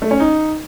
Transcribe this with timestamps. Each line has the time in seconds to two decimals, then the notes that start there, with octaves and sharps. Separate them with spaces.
0.02 A3
0.11 C#4
0.20 D#4